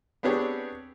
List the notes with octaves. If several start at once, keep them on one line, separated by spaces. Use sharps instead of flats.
B3 C4 D4 G4 G#4 C#5